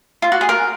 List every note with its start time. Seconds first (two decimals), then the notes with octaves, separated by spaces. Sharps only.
0.22 F4
0.32 F#4
0.41 G#4
0.49 A#4